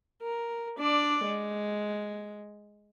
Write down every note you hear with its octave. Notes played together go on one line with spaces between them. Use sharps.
A#4
D4 D5
G#3